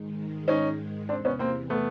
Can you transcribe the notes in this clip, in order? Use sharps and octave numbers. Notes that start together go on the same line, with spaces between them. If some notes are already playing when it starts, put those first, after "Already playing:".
Already playing: G#2 D#3 G#3
C#4 D#4
E2 C3 E3 C4 D4
B3 C#4
A#3 C4
A3 B3